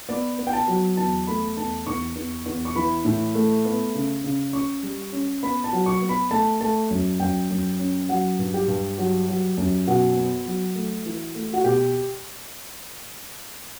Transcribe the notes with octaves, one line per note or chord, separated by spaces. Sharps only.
B3 D5
B3
G5
A5
F#3
E2 A5
A3 B5
E2 A5
E2 C#6
E2
E2
C#6
E3 B5
A2
A3
B3
C#3
C#3
C#4 C#6
G3
C#4
B3 B5
A5
F#3
C#6
B3
B5
A3 A5
A3 A5
F#2
F#2 G5
F#2
C#4
F#3 F#5
G2
G4
G2
F#3
F#3
F#2
B2 F#4
B3
F#3
A3
E3
A3
F#4
B2 G4